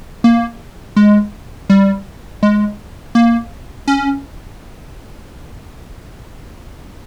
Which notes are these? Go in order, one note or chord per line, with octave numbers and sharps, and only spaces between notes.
A#3
G#3
G3
G#3
A#3
C#4